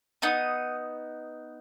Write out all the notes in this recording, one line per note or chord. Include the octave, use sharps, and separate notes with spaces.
B3 D#4 D#6